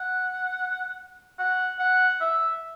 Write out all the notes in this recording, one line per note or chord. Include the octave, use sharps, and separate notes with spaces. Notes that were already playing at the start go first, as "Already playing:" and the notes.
Already playing: F#5
F#5
F#5
E5